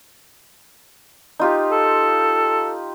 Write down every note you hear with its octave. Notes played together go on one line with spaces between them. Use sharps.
D#4 F4 G4
A4